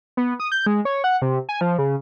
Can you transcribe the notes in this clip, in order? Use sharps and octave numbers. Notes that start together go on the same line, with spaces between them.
B3
D#6
G6
G#3
C#5
F#5
C3
G#5
F3
C#3